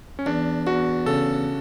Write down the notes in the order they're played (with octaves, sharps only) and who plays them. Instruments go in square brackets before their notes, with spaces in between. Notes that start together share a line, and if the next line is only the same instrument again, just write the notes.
[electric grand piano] C#4
[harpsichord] E2 [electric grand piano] D4
[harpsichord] E2 [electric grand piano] F#4
[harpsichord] C#3 [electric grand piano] A4